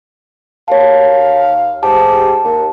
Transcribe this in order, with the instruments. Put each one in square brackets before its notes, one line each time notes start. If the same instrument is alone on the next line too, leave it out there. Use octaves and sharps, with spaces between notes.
[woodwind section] D#2 F5 [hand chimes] C#5 A5
[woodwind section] G#2 G4 [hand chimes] A5
[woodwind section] D#2